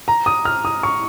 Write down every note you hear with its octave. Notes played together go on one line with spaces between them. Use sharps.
A#5
D#6
F6
D#6
C#6